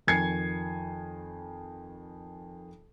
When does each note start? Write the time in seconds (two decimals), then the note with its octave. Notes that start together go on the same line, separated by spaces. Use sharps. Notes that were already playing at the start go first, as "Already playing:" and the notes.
0.07 F2 D#3 G#5 G#6 C7 C#7